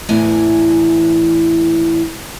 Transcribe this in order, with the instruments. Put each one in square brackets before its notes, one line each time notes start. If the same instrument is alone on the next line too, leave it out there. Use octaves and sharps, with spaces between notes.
[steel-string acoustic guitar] E2 A2 E3 G#5